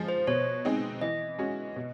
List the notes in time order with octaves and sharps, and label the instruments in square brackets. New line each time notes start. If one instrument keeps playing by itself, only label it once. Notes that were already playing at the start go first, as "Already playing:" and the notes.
Already playing: [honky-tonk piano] F3 G#3
[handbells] C5
[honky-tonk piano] B2 [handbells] C#5
[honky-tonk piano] G#3 C4 D#4
[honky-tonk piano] E3 [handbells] D#5
[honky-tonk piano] G#3 C#4 F#4
B2